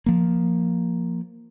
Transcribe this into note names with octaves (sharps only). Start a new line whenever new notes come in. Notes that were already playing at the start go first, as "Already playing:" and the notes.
F3 A#3